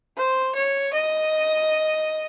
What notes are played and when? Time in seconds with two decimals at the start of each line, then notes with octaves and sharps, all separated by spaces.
0.17 C5
0.55 C#5
0.94 D#5